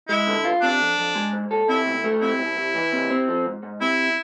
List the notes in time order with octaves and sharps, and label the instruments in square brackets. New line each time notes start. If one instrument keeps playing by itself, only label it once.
[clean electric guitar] G#3 [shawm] E4
[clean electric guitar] D3
F4
[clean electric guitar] C3 [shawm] D4
[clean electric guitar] F2
F2
G#3
G#2
A4
[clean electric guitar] C3 [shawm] E4
[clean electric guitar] D2
A3
[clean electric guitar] C3 [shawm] E4
[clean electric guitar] C2
C2
E3
C3
C4
F3
G#2
G#2
[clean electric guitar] C3 [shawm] E4